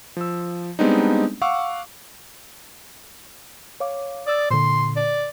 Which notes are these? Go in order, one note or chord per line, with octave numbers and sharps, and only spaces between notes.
F3 E6
G3 G#3 B3 C4 D4 D#4
F5 F#5 C#6 D6 E6
C#5 F5 D6
D5 D#6 E6 A6
A#2 D3 C6
D5